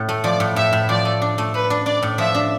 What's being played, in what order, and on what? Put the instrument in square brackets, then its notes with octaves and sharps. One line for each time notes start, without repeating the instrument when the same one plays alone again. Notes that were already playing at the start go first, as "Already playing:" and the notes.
Already playing: [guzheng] A2
A3
[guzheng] F3 [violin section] D5
[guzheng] A2
[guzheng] A2 [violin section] E5
[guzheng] A2
[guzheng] F3 [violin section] D5
[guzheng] A3
D4
A3
[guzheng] A3 [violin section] B4
[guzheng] D4
[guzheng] D4 [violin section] D5
[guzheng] A2
[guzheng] F3 [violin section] E5
[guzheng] D4